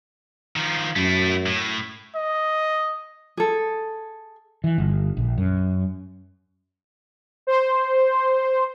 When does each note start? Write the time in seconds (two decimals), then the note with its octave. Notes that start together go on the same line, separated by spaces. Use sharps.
0.56 D#3 F3
0.96 F#2 A3 E4
1.46 A2
2.16 D#5
3.37 G#4 A4
4.64 E3
4.78 G1
5.17 A#1
5.38 F#2
7.47 C5